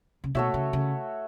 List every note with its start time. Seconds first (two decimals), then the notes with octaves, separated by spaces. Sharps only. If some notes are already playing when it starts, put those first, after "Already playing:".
0.24 C#3
0.35 B2 A3 F#4 C#5 E5
0.54 C#3
0.73 C#3